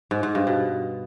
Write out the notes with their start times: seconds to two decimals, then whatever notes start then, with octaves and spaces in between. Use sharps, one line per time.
0.11 G#2
0.23 G#2
0.35 G2
0.47 B2